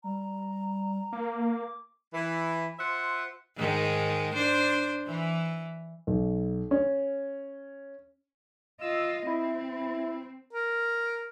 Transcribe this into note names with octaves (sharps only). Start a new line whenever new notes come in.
G3 A#5
A#3 D6
E3
F4 C5 E5 F#5
G#2 D#3 G#3
D4 C5
E3
B1
C#4
F4 D#5 E6
C4 E4
A#4